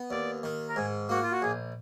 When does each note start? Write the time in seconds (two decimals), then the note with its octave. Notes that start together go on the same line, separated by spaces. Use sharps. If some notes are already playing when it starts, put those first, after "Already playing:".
Already playing: B3
0.11 D#2 D5
0.43 D#3
0.69 A#4
0.76 G#2 G#4
1.09 A#3 F#4
1.23 F4
1.32 F#4
1.42 A#1 G#4